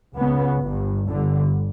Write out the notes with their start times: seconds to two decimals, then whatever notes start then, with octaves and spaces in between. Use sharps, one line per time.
0.16 C#2 C#3 B3
0.62 G1 G2
1.08 G1 G2 D3